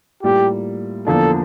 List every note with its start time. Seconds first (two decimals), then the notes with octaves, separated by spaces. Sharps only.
0.23 A2 G3 A#3 F4 G4
1.07 E2 D3 F3 A#3 D4 A4